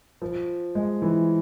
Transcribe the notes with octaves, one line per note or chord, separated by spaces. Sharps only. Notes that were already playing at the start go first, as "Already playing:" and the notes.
F3
G#3
E3